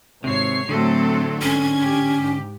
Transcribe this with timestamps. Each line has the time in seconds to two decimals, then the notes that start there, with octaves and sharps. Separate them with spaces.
0.24 G#1 C3 C4 C#5 C7
0.69 A2 D3 F#3 A3 C4 A4
1.42 A1 G#2 C#4 G#6
1.82 G4
2.14 G#2